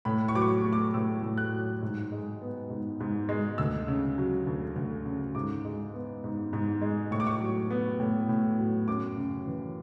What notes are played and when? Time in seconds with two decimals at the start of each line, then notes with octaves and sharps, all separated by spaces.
0.05 A2 B5
0.28 C#6
0.35 F#3 D6
0.42 C#6
0.65 A3
0.73 D6
0.94 A2 E6
1.23 A2
1.38 F#6
1.53 F#3
1.83 G#2
2.12 G#3
2.42 B3
2.70 G#2
3.00 G#2
3.29 G#3
3.58 D2 E6
3.88 C#3
4.18 F#3
4.47 D2
4.76 D2
5.05 C#3
5.35 G#2 D6
5.65 G#3
5.94 B3
6.24 G#2
6.53 G#2
6.82 G#3
7.11 A2 C#6
7.20 D6
7.27 C#6
7.40 F#3
7.71 B3
8.00 A2
8.29 A2
8.59 F#3
8.88 F#2 D6
9.17 C#3
9.47 E3